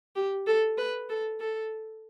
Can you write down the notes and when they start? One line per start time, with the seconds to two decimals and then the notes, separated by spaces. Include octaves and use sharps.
0.16 G4
0.47 A4
0.78 B4
1.09 A4
1.40 A4